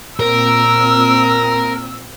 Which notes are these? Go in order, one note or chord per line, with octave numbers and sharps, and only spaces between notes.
A#2 C4 A#4 E6